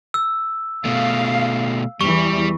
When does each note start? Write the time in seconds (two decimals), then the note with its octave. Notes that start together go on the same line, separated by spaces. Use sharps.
0.14 E6
0.85 B2 A3 F5
2.01 E2 E3 G3 C#6